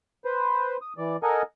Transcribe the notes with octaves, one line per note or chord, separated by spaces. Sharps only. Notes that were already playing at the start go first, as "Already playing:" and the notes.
B4 C5
D#6
E3 D5
A4 A#4 D#5 F#5 G#5